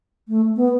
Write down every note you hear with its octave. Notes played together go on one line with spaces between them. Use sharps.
A3
B3